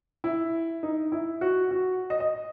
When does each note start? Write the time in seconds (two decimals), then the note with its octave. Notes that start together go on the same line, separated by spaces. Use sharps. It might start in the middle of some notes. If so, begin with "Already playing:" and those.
0.24 E4
0.83 D#4
1.12 E4
1.41 F#4
1.71 F#4
2.10 D#5
2.20 D#5